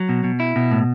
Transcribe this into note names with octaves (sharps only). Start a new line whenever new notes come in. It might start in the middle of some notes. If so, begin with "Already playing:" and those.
Already playing: F#3
B2
B2
E4
B2
A2